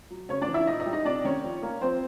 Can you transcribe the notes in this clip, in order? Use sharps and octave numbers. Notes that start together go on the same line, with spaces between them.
F#3
C#3 C#4 C#5
D4 D5
E3
E4 E5
A#2 D#4 D#5
D#4 D#5
G3
D#4 D#5
C3 D4 D5
D#3 C#4 C#5
F3
A#3
F3 C4 C5